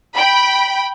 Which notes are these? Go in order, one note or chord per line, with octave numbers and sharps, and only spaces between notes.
G5 B5